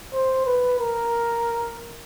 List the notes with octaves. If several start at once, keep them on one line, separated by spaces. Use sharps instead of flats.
C5
B4
A#4